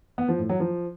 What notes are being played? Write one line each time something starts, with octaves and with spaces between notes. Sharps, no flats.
B3
F3
A2
F#3
F3